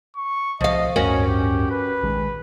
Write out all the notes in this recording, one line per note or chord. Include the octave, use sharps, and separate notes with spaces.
C#6
C2 C3 F3 D#5 F5
D1 G2 C#4 F#4 A#4 C#5
G4
B4
A#1 D#3 G#3